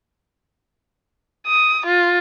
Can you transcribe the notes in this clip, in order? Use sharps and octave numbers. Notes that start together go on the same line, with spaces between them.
D#6
F4